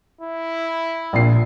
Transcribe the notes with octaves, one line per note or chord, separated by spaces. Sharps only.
E4
A#1 A#2 C7